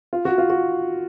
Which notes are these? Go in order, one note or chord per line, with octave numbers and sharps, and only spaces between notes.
F4
F#4
F4
F#4